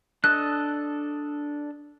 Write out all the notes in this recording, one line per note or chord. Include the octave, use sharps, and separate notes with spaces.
D4 A4 D#5 F#6